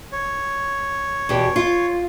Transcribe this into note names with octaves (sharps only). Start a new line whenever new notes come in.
C#5
E2 B2 G4
F4